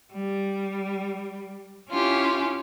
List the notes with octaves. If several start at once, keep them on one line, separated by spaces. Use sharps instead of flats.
G3
C#4 E4 F4 G4